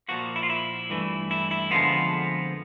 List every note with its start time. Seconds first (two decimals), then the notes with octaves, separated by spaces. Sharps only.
0.08 A#2 F3 A#3 F#4
0.36 E4
0.43 F4
0.50 E4
0.90 G2 E3 A3
1.31 E4
1.51 E4
1.71 F2 D3 F3 G#3 B3 F4